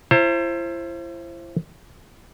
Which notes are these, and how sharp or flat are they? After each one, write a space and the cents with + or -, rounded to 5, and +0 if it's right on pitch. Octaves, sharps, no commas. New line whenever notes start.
E4 +40 C5 +20 A#5 -35